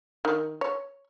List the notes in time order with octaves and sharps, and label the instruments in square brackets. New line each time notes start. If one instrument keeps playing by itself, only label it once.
[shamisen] D#3
C#5